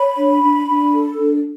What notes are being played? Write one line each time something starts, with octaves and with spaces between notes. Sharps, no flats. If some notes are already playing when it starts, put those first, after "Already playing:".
Already playing: C#5 B5
D4
D4
D4
A4
D4